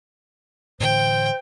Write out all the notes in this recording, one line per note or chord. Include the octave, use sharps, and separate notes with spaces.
A2 D3 E3 C5 G5